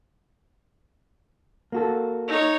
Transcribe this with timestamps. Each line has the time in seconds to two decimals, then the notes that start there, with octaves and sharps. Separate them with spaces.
1.72 A#3 F#4 A4
2.28 D#4 C#5